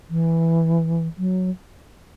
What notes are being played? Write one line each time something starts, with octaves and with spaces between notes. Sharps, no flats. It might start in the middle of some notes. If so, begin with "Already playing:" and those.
E3
F#3